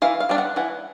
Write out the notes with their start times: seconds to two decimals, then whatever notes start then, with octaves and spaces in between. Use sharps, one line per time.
0.02 E3 F5
0.20 F5
0.29 G3 B3 D4
0.38 F#5
0.56 E3 F#5